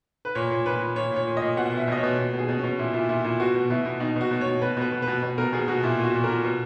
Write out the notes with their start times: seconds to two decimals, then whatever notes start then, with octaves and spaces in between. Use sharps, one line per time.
0.25 B4
0.35 A#2 C#5
0.51 A#2
0.66 A#2 B4
0.81 A#2
0.96 A#2 C#5
1.11 A#2
1.16 C#5
1.27 A#2
1.37 D#5
1.42 A#2
1.57 B2 F#5
1.72 B2 E5
1.88 B2 D#5
1.98 C#5
2.03 B2
2.18 B2
2.33 B2
2.38 G#4
2.48 B2
2.58 C#4
2.63 B2
2.79 A#2 E4
2.94 A#2 E4
3.09 A#2 E4
3.24 A#2 E4
3.40 B2 F#4
3.55 B2
3.70 B2 E4
3.85 B2
4.00 B2 D#4
4.16 B2 F#4
4.31 B2
4.41 C#5
4.47 B2
4.62 B2 B4
4.77 B2 B4
4.92 B2
5.02 B4
5.07 B2
5.23 B2
5.38 B2 A#4
5.53 B2 G#4
5.68 B2 F#4
5.83 A#2 E4
5.99 A#2 F#4
6.14 A#2
6.24 A#4
6.29 A#2
6.44 B2